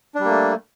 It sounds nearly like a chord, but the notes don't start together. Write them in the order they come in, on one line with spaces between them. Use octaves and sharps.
D4 G3 A#3 A3